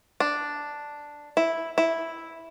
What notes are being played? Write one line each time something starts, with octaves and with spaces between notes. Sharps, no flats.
D4
E4
E4